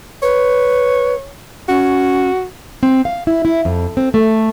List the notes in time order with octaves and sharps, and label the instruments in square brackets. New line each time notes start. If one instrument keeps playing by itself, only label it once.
[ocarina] B4 [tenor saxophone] C#5
[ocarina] C#4 [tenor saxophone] F#4
[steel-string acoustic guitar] C4
F5
E4
E4
F2
C4
A3